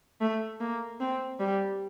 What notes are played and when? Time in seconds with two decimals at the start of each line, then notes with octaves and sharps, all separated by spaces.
0.21 A3
0.60 A#3
1.00 C4
1.39 G3